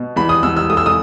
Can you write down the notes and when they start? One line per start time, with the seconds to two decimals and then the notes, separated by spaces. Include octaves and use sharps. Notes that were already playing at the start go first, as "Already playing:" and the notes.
Already playing: B2
0.16 E2 B5
0.29 D#6
0.43 E2 E6
0.57 E6
0.70 A3 D#6
0.77 E6
0.86 D#6